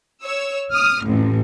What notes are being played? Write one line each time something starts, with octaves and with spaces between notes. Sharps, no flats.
C#5 E6
D#6 F6
A1 F2